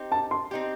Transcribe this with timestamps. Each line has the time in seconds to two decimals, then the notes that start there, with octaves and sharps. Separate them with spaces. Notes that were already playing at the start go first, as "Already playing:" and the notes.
Already playing: C4 D#4 G4
0.12 A5
0.31 C6
0.51 C4 D#4 G4